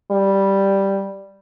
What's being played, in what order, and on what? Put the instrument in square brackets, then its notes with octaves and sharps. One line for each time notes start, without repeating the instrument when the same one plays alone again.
[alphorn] G3